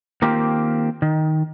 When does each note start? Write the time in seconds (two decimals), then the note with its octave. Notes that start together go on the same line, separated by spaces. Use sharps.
0.22 D#3 A#3 C4 F4 G4
1.02 D#3